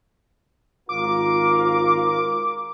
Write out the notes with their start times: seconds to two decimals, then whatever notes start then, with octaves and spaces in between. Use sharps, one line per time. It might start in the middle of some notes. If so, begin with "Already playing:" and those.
0.89 G#1 F4 A#4 D6